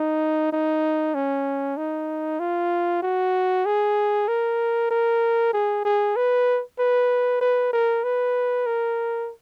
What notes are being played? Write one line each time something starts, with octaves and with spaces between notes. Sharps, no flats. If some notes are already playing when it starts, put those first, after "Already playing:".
Already playing: D#4
D#4
C#4
D#4
F4
F#4
G#4
A#4
A#4
G#4
G#4
B4
B4
B4
A#4
B4
A#4